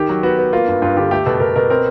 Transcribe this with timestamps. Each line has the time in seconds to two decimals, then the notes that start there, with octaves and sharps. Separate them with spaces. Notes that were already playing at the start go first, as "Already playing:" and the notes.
Already playing: D#3 G4
0.09 F#3
0.23 B3 F#4
0.38 B3
0.53 A#3 F4
0.68 G2
0.82 G2 F4
0.97 D3 G4
1.11 A3 G4
1.26 B2 A4
1.40 B2 A#4
1.56 B2 A#4
1.70 C4 A#4